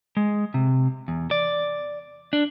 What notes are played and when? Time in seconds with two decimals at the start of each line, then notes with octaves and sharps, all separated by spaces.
0.17 G#3
0.54 C3
1.08 E2
1.31 D5
2.33 D4